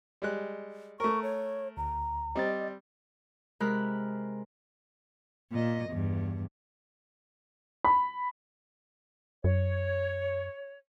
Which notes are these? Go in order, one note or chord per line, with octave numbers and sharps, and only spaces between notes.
G3 G#3 F#6
A3 A#4 C#6
C#5
D2 A#5
G3 C4 D5 D#5 A6
C3 G#3 A#4 B5 F6 F#6
A#2 D#5
E2 G2
B5
F#2 C#5